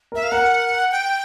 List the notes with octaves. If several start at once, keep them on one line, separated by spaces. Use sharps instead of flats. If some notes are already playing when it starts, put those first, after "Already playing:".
A#4
E5
F5
A#4 F#5
G5